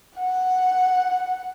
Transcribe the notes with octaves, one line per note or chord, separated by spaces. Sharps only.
F#5